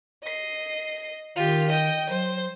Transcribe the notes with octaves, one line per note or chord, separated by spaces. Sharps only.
D#5 C7
D#3 F4 G4
D#5 G5
F#3 C5